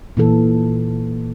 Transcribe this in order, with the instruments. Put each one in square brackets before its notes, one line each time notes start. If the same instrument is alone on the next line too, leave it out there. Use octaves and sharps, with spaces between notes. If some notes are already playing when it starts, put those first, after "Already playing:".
[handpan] A#2 E3 A4